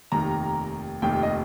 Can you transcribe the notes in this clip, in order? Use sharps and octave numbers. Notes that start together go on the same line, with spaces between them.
F1 D#2 D#3 A#5
F1 D#2 D#3 G5
D#5